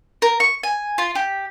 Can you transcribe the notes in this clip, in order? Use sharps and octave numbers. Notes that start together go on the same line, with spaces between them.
A#4
C#6
G#5
F4
G4